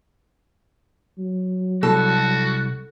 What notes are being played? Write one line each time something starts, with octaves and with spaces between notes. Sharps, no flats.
F#3
C2 F#4 A4